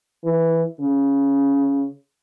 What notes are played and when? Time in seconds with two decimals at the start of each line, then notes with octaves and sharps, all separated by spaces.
0.24 E3
0.80 C#3